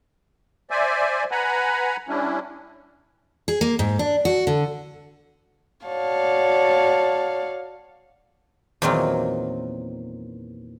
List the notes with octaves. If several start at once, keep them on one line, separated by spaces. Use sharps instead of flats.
C5 D5 E5 G#5
B4 F#5 G#5 A#5 B5
G3 C#4 D4 E4
G#4
A#3
G#2
D4
F#4
D3
F#4 C#5 D5 F5 A5
E2 A#2 D#3 F#3 C4 F4